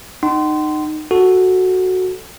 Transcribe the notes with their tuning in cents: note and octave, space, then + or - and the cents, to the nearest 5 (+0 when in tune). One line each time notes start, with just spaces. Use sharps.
D#4 -25 F#5 +40 C6 -15
F#4 +0 A4 +0